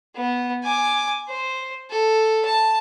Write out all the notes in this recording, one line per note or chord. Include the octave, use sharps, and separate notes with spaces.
B3
G#5 D6
C5
A4
A5